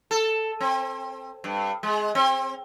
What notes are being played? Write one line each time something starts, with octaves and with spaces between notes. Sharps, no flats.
A4
C4
G2
G#3
C4